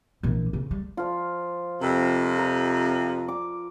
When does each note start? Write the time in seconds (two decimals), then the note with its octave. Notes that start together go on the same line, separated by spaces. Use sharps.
0.23 A#1 E3
0.53 C#3
0.71 G3
0.97 F3 F4
1.81 F2 C3 A#4
2.38 A#4 A#5
3.28 D6